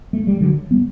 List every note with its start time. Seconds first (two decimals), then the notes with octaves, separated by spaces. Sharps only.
0.13 A3
0.27 G3
0.41 D3 F#3
0.71 G3 B3